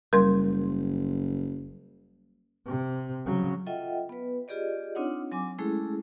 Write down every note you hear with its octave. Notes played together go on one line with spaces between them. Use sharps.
F#1 G3 A#4 C6
C3
C#3 F#3
F4 A4 D#5 E5 F#5 G5
B3 B4
F4 G4 G#4 D5 D#5
C4 D4 D#4 F4 C#5 F#5
F#3 C4 G#5 D6
G#3 A3 C#4 E4 G#4 A4